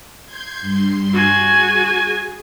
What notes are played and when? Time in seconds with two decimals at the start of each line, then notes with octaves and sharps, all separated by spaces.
0.25 C6 G6 G#6
0.61 G2 C6
1.13 F#4 G#5
1.50 G#4